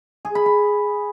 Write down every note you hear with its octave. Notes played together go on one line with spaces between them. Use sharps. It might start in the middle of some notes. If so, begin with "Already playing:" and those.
G#4
B5
B5